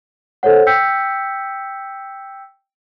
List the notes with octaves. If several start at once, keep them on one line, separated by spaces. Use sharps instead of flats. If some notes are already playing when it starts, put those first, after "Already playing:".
A4 C5 C#5 F#5
G5 E6 G6 B6 C#7